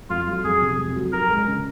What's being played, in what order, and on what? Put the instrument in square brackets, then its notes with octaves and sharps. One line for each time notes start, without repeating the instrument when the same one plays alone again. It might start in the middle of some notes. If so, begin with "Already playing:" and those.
[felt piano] F2 [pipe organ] F4
[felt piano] F#3
[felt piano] F2 [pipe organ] G#4
[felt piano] C3
F2
F#3
[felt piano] F#4 [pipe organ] A#4
[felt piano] G#3
C#3